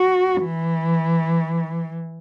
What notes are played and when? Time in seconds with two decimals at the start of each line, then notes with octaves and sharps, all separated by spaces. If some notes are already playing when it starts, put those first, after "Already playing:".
Already playing: F#4
0.44 E3